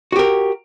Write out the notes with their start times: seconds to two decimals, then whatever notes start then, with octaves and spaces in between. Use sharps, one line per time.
0.12 F#4
0.16 G4
0.19 A#4